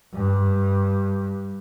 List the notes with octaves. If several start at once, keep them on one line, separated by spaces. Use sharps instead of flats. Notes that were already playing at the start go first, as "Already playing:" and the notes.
G2